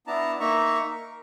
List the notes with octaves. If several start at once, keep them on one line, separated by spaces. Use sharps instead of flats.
B3 D4 E4 A5 A#5
A#3 D#4 E5 A#5 C#6
A#4